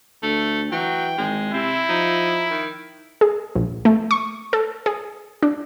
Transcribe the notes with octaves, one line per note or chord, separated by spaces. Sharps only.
D2 A3
E3 F#3 G5
G#1 G#3
C3 C4 E4
F3 D#4
D#3
G#4
A#1
A3
C#6
A4
G#4
D4